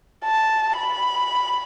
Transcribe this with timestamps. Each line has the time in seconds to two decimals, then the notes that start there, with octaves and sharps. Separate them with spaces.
0.25 A5
0.78 B5